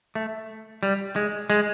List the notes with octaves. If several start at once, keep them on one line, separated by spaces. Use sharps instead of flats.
A3
G3
G#3
G#3